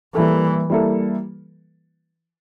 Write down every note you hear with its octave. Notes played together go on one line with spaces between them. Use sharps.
E3 G3 A#3 E4 A4
G3 A#3 E4 A4